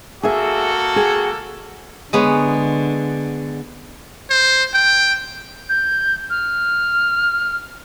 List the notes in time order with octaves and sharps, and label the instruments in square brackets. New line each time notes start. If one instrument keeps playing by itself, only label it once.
[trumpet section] A#3 F#4 A4 [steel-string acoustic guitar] G#4 E5
[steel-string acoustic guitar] G#4 G5
[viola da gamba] D3 [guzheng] G#3 B3 C#5
[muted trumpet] C5
G5
[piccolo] G6
F6